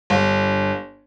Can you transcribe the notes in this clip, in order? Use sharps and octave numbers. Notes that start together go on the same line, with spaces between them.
G1